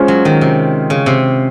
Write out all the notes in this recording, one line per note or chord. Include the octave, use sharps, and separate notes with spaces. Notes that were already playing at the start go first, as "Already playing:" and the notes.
Already playing: G#3 C#4 F4 C5
F#3
D#3
C3
C#3
C3